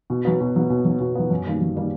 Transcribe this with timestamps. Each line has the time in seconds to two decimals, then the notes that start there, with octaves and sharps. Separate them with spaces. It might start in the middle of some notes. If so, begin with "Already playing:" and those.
0.10 B2
0.25 F#3 B3
0.41 B2
0.56 F#3 B3
0.70 B2
0.85 F#3 B3
1.00 B2
1.15 F#3 B3
1.30 F#2
1.46 D#3 G3 A#3
1.61 F#2
1.76 D#3 G3 A#3